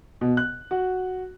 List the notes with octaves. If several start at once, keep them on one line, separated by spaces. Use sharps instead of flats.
B2
F#6
F#4